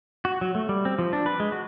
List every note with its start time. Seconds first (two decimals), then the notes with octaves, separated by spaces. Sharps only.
0.25 F#4
0.41 F#3
0.55 A3
0.69 G3
0.85 C4
0.99 F3
1.13 D4
1.26 B4
1.40 G#3
1.52 F#4